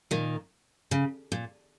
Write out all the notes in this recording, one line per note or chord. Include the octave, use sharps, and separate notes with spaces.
A#2 D#3
C#3
A#2